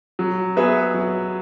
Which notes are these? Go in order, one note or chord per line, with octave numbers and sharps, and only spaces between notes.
F#3
B3 G#4 B4 E5
F#3